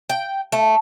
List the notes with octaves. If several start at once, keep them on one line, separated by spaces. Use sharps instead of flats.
G5
A3